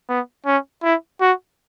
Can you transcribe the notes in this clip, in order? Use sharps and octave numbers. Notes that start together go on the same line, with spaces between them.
B3
C#4
E4
F#4